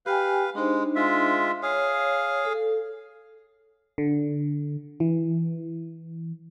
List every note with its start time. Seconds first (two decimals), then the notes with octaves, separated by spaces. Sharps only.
0.06 G4 B4 F5 G5 G#5
0.55 G#3 D4 D#4 C5
0.96 G#3 F4 E5
1.62 G#4 C#5 F5
2.45 A4
3.98 D3
5.00 E3